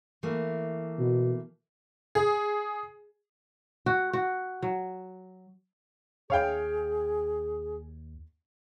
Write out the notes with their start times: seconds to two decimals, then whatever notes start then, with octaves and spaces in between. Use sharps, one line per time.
0.23 E3 A3 A#3
0.99 B2
2.15 G#4
3.86 F#4
4.13 F#4
4.62 F#3
6.30 D#2 G#4 C#5 F5 G5